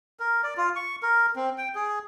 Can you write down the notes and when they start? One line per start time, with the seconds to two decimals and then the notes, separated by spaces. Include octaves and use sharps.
0.20 A#4
0.44 D5
0.57 F4
0.76 C#6
1.03 A#4
1.36 C4
1.58 G5
1.75 G#4